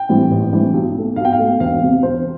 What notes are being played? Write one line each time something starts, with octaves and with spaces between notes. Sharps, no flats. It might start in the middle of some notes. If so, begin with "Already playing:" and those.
Already playing: G5
A2 E3 G3 C4
A1
A2 E3 G3 C4
B1
B2 A3
B1 F5
G5
F5
B2 A3
E1 F5
E2 C3
E1 C5